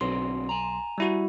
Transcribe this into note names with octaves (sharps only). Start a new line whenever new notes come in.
B1 D3 F#3 C4 C6
G#5 A#5
G3 E4 F#4